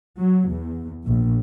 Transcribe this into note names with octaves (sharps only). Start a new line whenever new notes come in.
F#3
E2
A#1